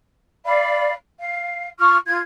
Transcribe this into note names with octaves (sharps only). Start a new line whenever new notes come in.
D5 F5 B5
F5
F4 C#6 F6
F4 G#6